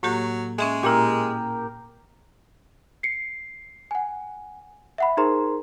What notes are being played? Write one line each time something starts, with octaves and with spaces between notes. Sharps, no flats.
A2 F#3 A#3 G4
G#3 C#4 G#4 E5
A#2 A#3 E4 G4 A#4
C7 C#7
F#5 G#5
E5 F#5 B5
D#4 G#4 A#4 C5 A#5 C6